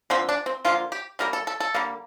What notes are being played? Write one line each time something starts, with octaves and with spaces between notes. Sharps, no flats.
D3 F3 A#3 C4
D4
C4
D3 F3 A#3 F4
G4
D3 G3 A#3 A#4
A4
A4
A4
D3 G3 A#3